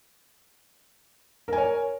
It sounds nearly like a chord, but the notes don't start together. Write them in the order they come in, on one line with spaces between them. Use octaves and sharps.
A#4 G#5 C#5